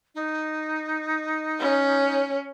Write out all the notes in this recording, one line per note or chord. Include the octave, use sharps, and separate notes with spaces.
D#4
C#4